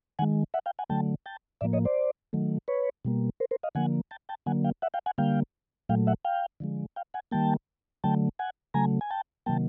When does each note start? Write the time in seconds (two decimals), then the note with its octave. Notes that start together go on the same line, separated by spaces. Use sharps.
0.19 D#3 G#3 F#5 G#5
0.54 E5 F#5
0.66 F5 G5
0.79 F#5 G#5
0.89 D3 F#3 A3 G5 A5
1.26 G5 A5
1.61 A2 F3 A#3 D5 E5
1.73 C#5 D#5
1.85 C5 D5
2.33 D#3 F#3 A3
2.68 B4 C#5
3.05 B2 G3 A#3
3.40 A#4 C5
3.51 A#4 C5
3.63 D#5 F5
3.75 D3 F3 A#3 F#5 G#5
4.11 G5 A5
4.29 G5 A5
4.46 D3 F#3 A#3 F#5 G#5
4.64 F5 G5
4.82 E5 F#5
4.94 F5 G5
5.06 F#5 G#5
5.18 D3 G3 A#3 F5 G5
5.89 A#2 F#3 A3 F5 G5
6.07 E5 F#5
6.25 F5 G5
6.60 D3 F3 G#3
6.96 F5 G5
7.14 F#5 G#5
7.32 D#3 G3 A#3 G5 A5
8.04 D3 F#3 A3 G5 A5
8.39 F#5 G#5
8.74 C#3 F#3 A3 G#5 A#5
9.01 G#5
9.10 G5 A5
9.46 C3 D#3 F#3 A#3 G5 A5